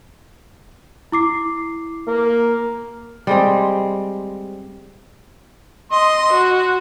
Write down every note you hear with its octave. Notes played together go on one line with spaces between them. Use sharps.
E4 D6 C7
A#3
G3 G#3 C4
D#5 C6
F#4